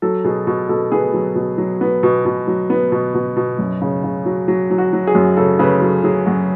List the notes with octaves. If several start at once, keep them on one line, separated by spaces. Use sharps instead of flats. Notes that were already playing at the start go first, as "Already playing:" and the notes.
F#3 A4
B2 G#4
B2
B2 A4
B3 G#4
F#3
B2
F#3
B3
B2
B2
F#3
B3
B2
B2
B2
F#2
C#3
C#3
F#3
F#3
F#3
F#4
F#3
G#4
F#2
C#3 A4
C#3 B4
F#3 A4
F#3 G#4
F#2 F#4